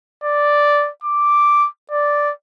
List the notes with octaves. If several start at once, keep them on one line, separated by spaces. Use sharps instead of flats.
D5
D6
D5